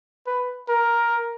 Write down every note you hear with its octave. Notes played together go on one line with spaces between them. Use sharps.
B4
A#4